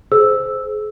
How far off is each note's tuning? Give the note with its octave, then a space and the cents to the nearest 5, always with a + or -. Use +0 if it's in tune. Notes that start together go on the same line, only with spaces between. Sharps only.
G#4 +40 C5 -10 E6 +0